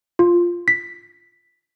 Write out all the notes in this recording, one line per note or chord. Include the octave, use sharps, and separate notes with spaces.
F4
B6